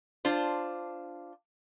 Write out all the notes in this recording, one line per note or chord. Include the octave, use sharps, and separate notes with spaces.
D4 F4 C5